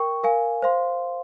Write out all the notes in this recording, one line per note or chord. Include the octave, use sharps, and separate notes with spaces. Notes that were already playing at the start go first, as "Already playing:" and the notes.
Already playing: A#4 G5 C#6
A#4 F5 G#5
C5 F5 C6